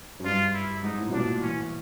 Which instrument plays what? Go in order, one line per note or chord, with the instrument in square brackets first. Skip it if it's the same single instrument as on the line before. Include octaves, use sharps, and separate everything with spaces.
[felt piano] F#2
[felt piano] G2 [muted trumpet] F4
[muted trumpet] E4
[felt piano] G#2 [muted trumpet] D#4
[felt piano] A2
B2
[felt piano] A#2 [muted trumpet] D4
[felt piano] E3 [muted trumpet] C#4